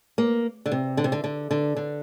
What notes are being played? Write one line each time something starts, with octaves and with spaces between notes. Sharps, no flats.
A#3
D3
C3
D3
C3
D3
D3
D3
D3